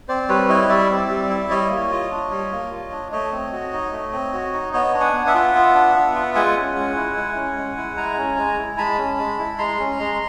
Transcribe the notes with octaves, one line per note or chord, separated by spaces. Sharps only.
C4 C5 D5
G3 B4 C#5
E4 C#5 D#5
G3 D5 E5
C4
G3
E4
G3 C#5 D#5
A#3
F4
D4
G3
A#3
F4
D4
A3 C#5 D#5
C4
F#4
D#4
A3
C4
F#4
D#4
B3 C#5 D#5
D4
F#5 G#5
B3
E5 F#5
F4
B3
D4
B3
F4
G#3 F#5 G#5
C#4
G#3
E4
G#3
C#4
G#3
E4
G#3 G#5 A#5
C#4
G#3
E4
G#3 A5 B5
C#4
G#3
E4
G#3 A#5 C6
C#4
G#3